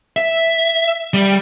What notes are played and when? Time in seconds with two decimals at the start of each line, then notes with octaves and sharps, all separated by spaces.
0.16 E5
1.14 G3